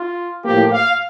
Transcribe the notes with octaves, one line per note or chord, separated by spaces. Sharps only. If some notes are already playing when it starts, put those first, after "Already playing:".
Already playing: F4
A2 F3 A#3 G4
F5